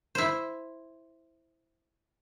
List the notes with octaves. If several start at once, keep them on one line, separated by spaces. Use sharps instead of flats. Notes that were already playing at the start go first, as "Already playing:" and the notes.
E4 C5